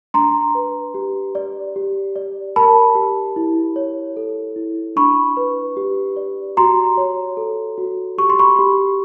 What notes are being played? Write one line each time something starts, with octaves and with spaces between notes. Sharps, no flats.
D4 A#5 C6
B4
G4
D5
G4
D5
A#4 A5 B5
G4
E4
C#5
A4
E4
D4 B5 C#6
B4
G4
D5
F#4 A#5 C6
C#5
A4
F#4
G4 C#6
C6
B5 C#6
G4